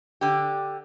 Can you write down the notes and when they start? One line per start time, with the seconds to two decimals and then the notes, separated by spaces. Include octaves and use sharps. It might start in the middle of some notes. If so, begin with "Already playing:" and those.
0.21 D3 G4